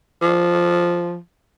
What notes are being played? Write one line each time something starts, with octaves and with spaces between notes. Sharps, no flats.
F3